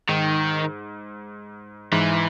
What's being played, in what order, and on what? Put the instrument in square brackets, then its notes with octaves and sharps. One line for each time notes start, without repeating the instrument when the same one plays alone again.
[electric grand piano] G#2 [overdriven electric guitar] D#3
[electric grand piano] G#2 [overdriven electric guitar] E3